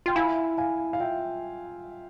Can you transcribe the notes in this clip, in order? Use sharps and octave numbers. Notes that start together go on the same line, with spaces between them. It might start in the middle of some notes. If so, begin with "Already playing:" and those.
F4 G5
E4 F5 G#5
F5 G#5
F5
F4 E5 G5